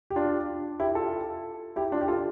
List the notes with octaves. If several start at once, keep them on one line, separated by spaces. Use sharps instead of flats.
G4
D4 F4
E4 G4
F4 A4
E4 G4
D4 F4
G4
F4 A4